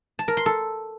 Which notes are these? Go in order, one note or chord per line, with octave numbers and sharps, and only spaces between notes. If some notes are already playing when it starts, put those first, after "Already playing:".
A5
A#4
C6
A4